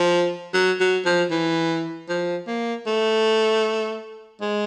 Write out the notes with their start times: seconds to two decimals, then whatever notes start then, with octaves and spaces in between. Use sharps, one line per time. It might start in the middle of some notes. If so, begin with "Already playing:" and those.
Already playing: F3
0.54 F#3
0.80 F#3
1.05 F3
1.31 E3
2.09 F3
2.47 A#3
2.87 A3
4.41 G#3